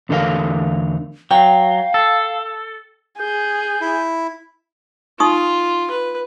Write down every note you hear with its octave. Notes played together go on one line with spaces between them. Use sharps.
E2 D3 A3 D#4 A#4 F5
F#3 F5 G5
A4
G#4 G6
E4
D#4 F4 C#6 D#6
B4